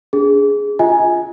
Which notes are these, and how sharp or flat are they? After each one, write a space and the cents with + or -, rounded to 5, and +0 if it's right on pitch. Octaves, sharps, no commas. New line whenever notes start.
D4 -35 G#4 +0
F4 +0 D#5 +45 G#5 +0